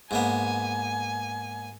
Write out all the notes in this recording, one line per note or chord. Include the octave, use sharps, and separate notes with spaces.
G#2 A#3 B3 G#5